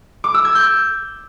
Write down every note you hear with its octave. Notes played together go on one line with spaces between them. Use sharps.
D6
E6
G#6
G6